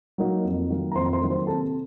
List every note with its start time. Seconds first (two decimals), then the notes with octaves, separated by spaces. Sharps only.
0.18 F#3 A#3 D#4
0.45 F2
0.70 D#3 F#3 A#3
0.92 A#5
0.95 F2 C5 C6
1.06 A#5
1.12 C5 C6
1.21 D#3 F#3 A#3
1.30 C5 C6
1.47 C3 A4 A5